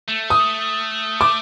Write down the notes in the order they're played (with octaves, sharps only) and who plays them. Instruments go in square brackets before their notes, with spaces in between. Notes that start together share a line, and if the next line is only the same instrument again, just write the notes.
[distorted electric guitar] A3
[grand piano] D#6
D6